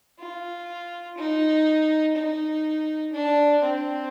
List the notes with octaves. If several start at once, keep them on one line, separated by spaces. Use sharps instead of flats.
F4
D#4
D#4
D4
C4